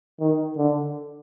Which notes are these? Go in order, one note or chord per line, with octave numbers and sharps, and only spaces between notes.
D#3
D3